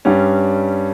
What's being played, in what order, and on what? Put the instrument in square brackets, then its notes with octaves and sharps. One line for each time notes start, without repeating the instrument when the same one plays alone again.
[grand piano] G2 G3 C#4